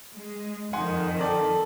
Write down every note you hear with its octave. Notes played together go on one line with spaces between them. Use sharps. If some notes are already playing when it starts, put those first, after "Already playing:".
G#3
F2 D#3 D#4 F#5 G#5 C6
A4 D5 G5